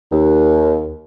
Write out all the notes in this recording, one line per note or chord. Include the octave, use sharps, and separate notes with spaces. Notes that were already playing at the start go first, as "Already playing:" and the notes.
D#2